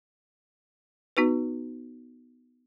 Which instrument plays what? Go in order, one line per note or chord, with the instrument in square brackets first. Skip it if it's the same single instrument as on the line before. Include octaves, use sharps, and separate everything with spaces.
[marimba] B3 D#4 F#4 B4